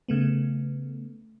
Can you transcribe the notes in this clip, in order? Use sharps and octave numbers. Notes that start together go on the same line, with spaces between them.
C#3 A3 B3